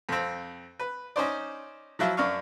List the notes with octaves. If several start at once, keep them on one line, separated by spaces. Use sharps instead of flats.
F2 C4
B4
C#4 D#4 C5 D5
F3 F#3 E4 F4
F#2 D4 F5 C#6